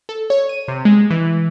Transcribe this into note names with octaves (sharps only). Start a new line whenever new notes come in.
A4
C#5
D#7
C3
G#3
E3